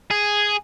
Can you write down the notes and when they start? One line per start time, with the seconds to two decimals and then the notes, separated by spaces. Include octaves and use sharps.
0.11 G#4